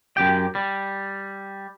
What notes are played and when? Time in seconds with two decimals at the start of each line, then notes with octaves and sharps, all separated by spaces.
0.17 F#2 G4 G5
0.55 G3